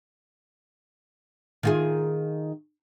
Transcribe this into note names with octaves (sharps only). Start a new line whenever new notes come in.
D#3 F4 G#4